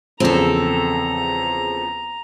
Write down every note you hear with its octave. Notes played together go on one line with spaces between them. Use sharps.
E2 C#3 F3 C4 A4 A#5